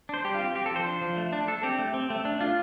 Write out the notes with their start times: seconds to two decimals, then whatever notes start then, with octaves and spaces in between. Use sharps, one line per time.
0.09 D4 C5
0.24 G3 G4
0.35 C4 F4
0.45 G4
0.55 C4 G4
0.66 F3 A4
0.76 C5
0.86 D4
1.02 F3
1.17 A3
1.33 D4
1.48 A3 A4
1.63 C4 G4
1.79 A3
1.94 C4
2.10 A3
2.25 D4
2.41 D4 F4